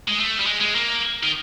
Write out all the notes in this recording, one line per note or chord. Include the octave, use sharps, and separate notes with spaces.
G#3
A3
G3
G#3
G#3
A#3
D#3